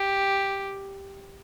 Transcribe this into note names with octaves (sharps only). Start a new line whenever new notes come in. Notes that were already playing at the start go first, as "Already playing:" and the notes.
Already playing: G4